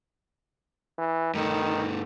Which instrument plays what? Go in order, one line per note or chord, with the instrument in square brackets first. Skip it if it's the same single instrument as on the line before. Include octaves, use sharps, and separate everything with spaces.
[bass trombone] E3
[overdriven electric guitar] G2 A3 [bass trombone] D#3